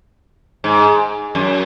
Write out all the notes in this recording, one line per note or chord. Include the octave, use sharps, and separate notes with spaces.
G#2
F#2